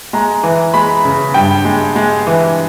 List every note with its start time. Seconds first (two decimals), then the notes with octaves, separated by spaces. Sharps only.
0.13 G#3 A#5
0.43 E3
0.74 G#3 B5
1.05 C#3
1.34 G2 G5
1.65 G#3
1.95 G#3
2.27 E3